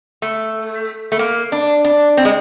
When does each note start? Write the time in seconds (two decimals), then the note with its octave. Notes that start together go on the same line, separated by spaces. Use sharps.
0.22 A3
1.12 A3
1.19 A#3
1.52 D4
1.85 D4
2.17 C4
2.25 G#3